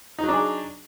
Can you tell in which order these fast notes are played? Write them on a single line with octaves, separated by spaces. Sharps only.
D#4 F#3 D4 G#4